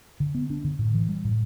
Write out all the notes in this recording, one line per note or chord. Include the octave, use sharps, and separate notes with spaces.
D3
B3
D4
D3
A2
E3
G3
A2